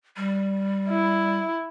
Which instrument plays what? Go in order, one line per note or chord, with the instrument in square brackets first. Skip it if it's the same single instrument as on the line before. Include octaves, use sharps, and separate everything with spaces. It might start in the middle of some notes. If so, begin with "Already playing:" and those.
[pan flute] G3
[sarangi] E4